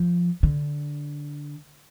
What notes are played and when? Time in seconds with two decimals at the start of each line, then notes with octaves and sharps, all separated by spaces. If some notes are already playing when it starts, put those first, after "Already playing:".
Already playing: F3
0.43 D3